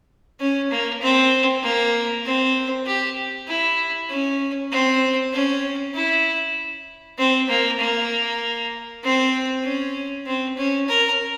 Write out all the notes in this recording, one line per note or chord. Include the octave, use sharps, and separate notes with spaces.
C#4
A#3
C4
A#3
C4
G4
E4
C#4
C4
C#4
E4
C4
A#3
A#3
C4
C#4
C4
C#4
A#4